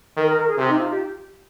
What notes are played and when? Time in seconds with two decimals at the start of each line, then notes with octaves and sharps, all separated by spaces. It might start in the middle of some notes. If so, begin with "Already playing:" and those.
0.16 D#3 A#4
0.27 A#4
0.37 A#4
0.48 G#4
0.58 C3 G4
0.69 D#4
0.79 F4
0.89 G4